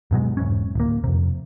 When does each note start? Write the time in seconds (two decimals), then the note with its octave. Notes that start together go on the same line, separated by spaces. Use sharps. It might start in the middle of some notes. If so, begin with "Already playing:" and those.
0.11 G2 B2 F#3 G#3
0.37 E1 G#2 C#4
0.75 D1 A#3
1.04 F2 C3